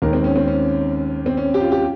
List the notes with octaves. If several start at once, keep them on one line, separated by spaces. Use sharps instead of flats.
D#2 D#3 G#3 A#4
C4
C#4
C4
C#4
C4
C#4
G4
F4
G4